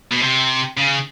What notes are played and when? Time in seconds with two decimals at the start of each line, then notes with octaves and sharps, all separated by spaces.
0.11 B2
0.22 C3
0.77 C#3